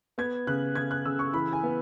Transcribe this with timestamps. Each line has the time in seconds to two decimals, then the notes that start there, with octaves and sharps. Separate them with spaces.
0.18 B3 G#6
0.47 C#3 F#6
0.75 C#3 G#6
0.91 F#6
1.05 C#3 E6
1.19 C#6
1.34 E3 B5
1.53 G#5
1.63 B3